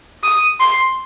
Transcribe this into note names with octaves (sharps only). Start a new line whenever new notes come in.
D#6
C6